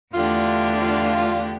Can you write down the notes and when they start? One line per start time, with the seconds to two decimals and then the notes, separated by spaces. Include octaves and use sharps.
0.13 E2 D3 A3 D4 F4 G4
0.81 F4